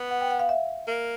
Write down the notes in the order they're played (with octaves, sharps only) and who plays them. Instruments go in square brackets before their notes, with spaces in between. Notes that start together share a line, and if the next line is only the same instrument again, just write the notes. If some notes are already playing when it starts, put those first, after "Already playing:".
Already playing: [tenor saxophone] B3
[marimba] F#5
G5
F#5
F5
E5
[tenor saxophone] A#3